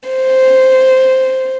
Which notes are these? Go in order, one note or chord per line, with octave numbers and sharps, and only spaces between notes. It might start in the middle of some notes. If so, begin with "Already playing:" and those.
C5